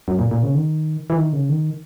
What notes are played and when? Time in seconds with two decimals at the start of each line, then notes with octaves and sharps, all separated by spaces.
0.08 F#2
0.19 A#2
0.31 A#2
0.43 C#3
0.55 D#3
1.10 E3
1.17 D#3
1.33 C#3
1.49 D#3